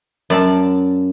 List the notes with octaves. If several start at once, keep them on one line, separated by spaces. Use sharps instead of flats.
F#2 D5 A5